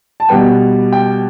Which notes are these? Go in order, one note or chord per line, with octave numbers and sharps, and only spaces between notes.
A5
B2 G3 B3 G5
G5